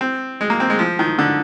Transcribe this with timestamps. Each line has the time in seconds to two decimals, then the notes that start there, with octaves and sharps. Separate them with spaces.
0.01 C4
0.41 G#3
0.50 A#3
0.60 C4
0.70 G#3
0.79 F3
0.99 D#3
1.19 D3